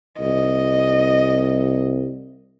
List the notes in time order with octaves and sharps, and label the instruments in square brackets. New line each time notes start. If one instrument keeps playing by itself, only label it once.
[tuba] C2 [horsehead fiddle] D#5